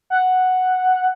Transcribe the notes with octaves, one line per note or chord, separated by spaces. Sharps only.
F#5